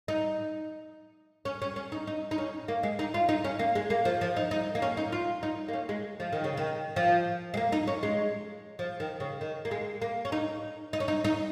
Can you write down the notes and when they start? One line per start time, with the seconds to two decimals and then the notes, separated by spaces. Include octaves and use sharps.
0.08 D#4
1.45 C#4
1.62 C#4
1.76 C#4
1.92 D#4
2.07 D#4
2.31 D#4
2.38 C#4
2.68 A#3
2.83 G#3
2.99 D#4
3.14 F4
3.29 D#4
3.44 C#4
3.59 A#3
3.75 G#3
3.90 A#3
4.05 F3
4.21 F3
4.36 D#4
4.51 D#4
4.75 A#3
4.82 C#4
4.97 D#4
5.12 F4
5.43 D#4
5.68 A#3
5.73 C#4
5.89 G#3
6.20 F3
6.33 D#3
6.44 C#3
6.57 D#3
6.96 F3
7.54 G#3
7.57 A#3
7.72 D#4
7.87 C#4
8.03 G#3
8.79 F3
9.00 D#3
9.20 C#3
9.41 D#3
9.65 A#3
9.71 G#3
10.02 A#3
10.25 C#4
10.32 D#4
10.93 D#4
11.00 C#4
11.08 D#4
11.24 D#4